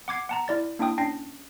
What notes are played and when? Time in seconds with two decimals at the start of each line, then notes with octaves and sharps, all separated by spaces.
0.08 F#5 D6 G#6 C7
0.29 F#5 A5 A#5
0.48 E4 D5 A6
0.79 A#3 D4 E4 G5 D#6
0.98 C#4 D4 G5 A#6 C7